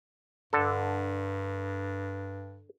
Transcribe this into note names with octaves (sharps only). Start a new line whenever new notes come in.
G2 D3 A4